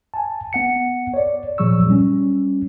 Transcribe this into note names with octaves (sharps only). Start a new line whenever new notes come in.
G#5 A5
B3 F#5 C#7
C#5 D5
A#2 F3 F#3 G#4 C#6 E6
G3 C#4